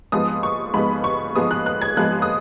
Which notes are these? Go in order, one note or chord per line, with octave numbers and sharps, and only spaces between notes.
G#2 F3 G#3 B3 D#6
C#6
G#2 F3 G#3 B3 B5
C#6
G#2 F3 G#3 B3 D#6
F#6
F#6
G#6
G#2 F3 G#3 B3 F#6
D#6